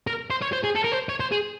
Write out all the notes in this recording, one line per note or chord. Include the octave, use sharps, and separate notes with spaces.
A#4
C5
C#5
C5
G#4
A4
A#4
C5
C#5
C5
G#4